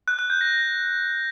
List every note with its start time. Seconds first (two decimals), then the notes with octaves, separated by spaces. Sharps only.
0.08 F#6
0.19 F#6
0.30 G6
0.41 A#6